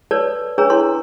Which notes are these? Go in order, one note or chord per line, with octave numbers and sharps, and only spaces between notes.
A4 B4 C#5 D5 A5
C#4 D4 G#4 B4 C#5 A#5
E4 A4 C#5 C6